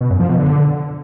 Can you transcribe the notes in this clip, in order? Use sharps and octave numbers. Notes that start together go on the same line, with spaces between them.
B2
F#2
F3
B2
D3